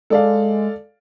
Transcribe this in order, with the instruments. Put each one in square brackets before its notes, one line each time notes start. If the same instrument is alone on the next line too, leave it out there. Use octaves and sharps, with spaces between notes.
[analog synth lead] G#3 [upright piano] A4 D5 F5